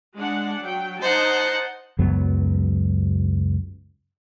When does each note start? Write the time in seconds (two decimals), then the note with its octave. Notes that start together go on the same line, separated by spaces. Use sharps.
0.17 G#3 D4 F#5
0.62 F#3 G5
1.02 D#4 C5 D#5 F#5 A5
1.99 C#2 F#2 F#3 B3